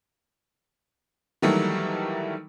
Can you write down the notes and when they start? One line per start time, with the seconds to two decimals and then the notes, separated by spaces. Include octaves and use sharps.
1.42 D#3 E3 F#3 G3 A3 A#3